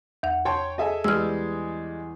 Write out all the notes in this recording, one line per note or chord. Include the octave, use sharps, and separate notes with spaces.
E2 F#5
C#5 G5 A5 C6
G#4 A4 D#5 E5 G#5
E2 G3 G#3 E6 F6